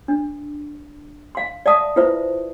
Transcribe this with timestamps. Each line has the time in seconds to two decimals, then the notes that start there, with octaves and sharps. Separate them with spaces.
0.08 D4
1.35 F5 C6
1.66 D5 E5 F5 A5 D#6
1.96 E4 F4 B4 C5 E5